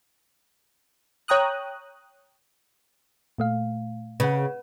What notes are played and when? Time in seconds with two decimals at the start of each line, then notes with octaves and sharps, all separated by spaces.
1.28 C#5 G5 A#5 D#6 F#6
3.38 A#2 A3 F5
4.20 C#3 B4 F#5